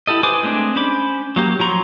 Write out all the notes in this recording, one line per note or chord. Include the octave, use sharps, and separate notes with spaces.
E4 G4 A4 D#5
B4 C5 G#5 D6 D#6
G#3 A3 C4 D4
C#4 C5 B5 D6
F#3 A#3 G4
F3 F#3 A#5 C6 C#6